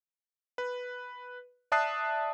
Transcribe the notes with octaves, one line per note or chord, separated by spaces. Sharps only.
B4
D5 E5 A5 D#6 F#6 C7